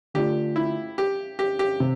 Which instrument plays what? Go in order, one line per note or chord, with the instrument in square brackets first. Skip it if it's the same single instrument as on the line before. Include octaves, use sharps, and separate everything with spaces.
[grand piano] D3 A3 D4 F4 [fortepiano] G4
[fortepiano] E4
G4
G4
G4
[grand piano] C3